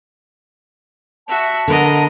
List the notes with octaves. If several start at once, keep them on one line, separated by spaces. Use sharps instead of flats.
F#4 E5 A5
D3 B3 A#4 D#5